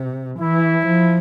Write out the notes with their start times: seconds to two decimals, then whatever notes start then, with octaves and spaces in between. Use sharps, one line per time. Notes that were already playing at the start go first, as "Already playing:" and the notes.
Already playing: C3
0.39 E3 E4
0.86 F3